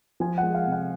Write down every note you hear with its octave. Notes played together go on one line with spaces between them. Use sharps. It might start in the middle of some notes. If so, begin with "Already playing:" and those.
F3 G#5
F#5
G#3
F5
C3
F#5